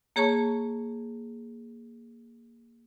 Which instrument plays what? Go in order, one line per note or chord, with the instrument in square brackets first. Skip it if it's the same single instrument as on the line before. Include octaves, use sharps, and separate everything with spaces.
[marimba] A#3 G#4 C#5 A5 C#6